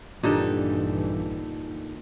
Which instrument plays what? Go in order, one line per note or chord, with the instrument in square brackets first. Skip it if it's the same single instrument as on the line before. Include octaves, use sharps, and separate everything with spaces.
[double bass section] A#1 G2 E3 [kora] A#2 D3 [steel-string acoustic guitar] D#4 G4 A4